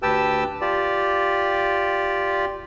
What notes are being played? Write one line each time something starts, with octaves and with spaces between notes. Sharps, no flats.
D2 G4 B4 G5 A5 E6
F4 G4 D5